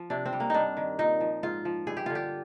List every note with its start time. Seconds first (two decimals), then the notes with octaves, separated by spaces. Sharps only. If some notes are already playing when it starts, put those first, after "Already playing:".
Already playing: F3
0.10 C3 D4
0.26 C4
0.33 G3
0.40 A#3
0.50 G2 D4 D#4
0.77 D#3
0.99 A#2 D#4
1.21 F3
1.43 G#2 F4
1.65 F3
1.87 G2 G#4
1.97 G4
2.06 D3 F4
2.15 G4